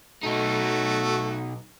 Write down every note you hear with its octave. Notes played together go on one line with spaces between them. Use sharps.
B1 A3 D#4 F#4